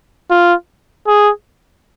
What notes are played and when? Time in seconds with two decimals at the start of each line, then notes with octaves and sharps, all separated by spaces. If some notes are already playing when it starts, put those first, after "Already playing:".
0.30 F4
1.07 G#4